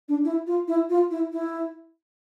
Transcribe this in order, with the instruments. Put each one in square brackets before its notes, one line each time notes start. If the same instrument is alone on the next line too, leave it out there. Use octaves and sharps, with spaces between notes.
[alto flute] D4
E4
F4
E4
F4
E4
E4